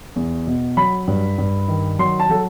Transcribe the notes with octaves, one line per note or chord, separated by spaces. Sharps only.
E2
B2
F#3 B5
G2
G2
D#3
F#3 C6
A5
F#3 A4